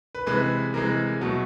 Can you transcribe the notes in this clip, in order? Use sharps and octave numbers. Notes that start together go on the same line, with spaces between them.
B4
C3 E3 G#3 B4
C3 E3 G#3 A#4
B2 F#3 A3